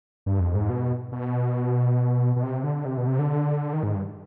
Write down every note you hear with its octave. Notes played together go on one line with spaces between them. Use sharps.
G2
F2
G#2
B2
B2
B2
C3
D3
C3
B2
C3
D3
D#3
G#2
G2